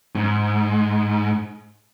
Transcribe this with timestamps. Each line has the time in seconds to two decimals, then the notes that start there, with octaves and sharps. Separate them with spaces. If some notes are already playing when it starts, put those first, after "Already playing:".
0.15 G#2